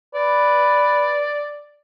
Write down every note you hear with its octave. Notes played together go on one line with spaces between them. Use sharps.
B4 D5